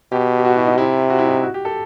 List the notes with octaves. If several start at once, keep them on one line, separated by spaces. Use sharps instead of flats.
B2 G4
G4
F#4
E4
D#4
C3 E4
F#4
E4
D#4
F#4
G4
A4